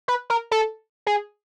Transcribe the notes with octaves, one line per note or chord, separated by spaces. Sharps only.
B4
A#4
A4
G#4